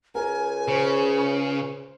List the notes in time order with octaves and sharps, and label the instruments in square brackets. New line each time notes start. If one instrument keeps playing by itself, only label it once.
[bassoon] C#2 [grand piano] A#4 [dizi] G#5
[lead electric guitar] C#3 [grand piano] C5